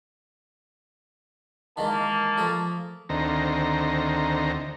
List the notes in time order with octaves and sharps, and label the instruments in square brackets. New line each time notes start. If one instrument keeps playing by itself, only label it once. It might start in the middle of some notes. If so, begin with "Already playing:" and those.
[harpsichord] D#3 E3 G#3 [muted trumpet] A#3 [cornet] A5
[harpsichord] F3 A3 G#4
[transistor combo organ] D2 D#3 C4 A#5